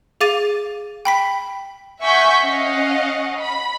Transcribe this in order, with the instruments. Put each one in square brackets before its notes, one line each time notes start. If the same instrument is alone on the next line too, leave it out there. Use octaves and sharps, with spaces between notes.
[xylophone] G#4 F5 D6 A6 D#7
G5 B5 B6
[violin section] E5 F#5 G#5 C#6 G6 B6
C#4 D#5 F5 F#5
B5